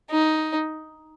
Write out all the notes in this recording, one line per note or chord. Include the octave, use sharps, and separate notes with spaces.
D#4